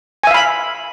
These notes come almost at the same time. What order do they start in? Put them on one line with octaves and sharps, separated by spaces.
G#5 E5 F5 B5